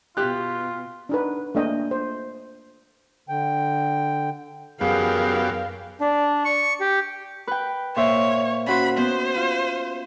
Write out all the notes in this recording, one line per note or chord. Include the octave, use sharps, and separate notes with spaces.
B2 F4 G4 F#6
D4 D#4 B4
A3 A#3 D4 D#5 G5
C5
D3 G5
F#2 B3 G4 G#4 A#4 F5
D4
C#6
G4
B4 G5
A#2 C5 C#5 E5
C#4 F#4 C5 B5
B3 C5
F4